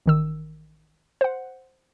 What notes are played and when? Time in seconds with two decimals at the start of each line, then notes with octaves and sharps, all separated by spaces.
0.06 A1 D#3 E6
1.21 C5 F#5